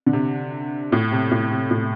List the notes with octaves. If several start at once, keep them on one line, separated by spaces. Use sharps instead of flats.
D3
C3
A2
C3
A2
C3
A2